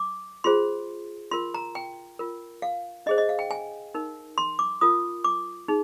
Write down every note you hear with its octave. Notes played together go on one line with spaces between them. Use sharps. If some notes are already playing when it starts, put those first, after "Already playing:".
Already playing: D6
F4 G#4 C5 C6
F4 A#4 C6
A#5
G5
F4 A#4
F5
D4 G#4 C5 D#5
D#5
F5
G5
G#5
D#4 A#4
C6
D6
F4 A#4 D#6
D6
D#4 G#4